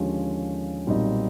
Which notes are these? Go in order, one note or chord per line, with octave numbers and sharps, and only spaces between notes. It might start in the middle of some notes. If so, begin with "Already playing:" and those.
Already playing: D#2 D3 F3 G#3 C#4
B1 A#2 G3 C4 D#4